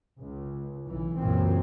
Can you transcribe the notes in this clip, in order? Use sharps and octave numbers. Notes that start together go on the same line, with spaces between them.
C#2
B1 E3
C#2 F#2 A#2 E3 F#3 C4